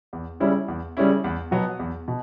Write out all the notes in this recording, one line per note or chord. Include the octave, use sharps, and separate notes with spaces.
E2
C#3 G3 C#4 E4
E2
C#3 G3 C#4 E4
E2
B2 F#3 B3
E2
B2